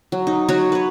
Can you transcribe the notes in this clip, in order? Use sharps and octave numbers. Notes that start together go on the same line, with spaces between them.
F#3
D#4
F#3 F#4 C#5
B4 C#5